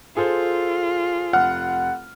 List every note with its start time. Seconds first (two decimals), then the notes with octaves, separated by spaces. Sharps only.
0.17 F4 G#4 A4 C5
1.33 F1 F#5 F6